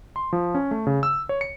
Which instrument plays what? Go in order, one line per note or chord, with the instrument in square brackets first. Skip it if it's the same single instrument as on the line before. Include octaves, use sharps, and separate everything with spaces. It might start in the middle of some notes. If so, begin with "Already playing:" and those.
[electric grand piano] C6
F3
C#4
A3
C#3
E6
C#5
C#7